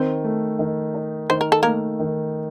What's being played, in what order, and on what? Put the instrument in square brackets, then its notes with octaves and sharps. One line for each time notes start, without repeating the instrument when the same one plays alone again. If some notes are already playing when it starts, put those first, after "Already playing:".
Already playing: [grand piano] D#3 [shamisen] C4 C5
[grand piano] A3
D#3
D#4
[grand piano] D#3 [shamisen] C5
[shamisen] A#4
A4
[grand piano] A3 [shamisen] A#3 A#4
[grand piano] D#3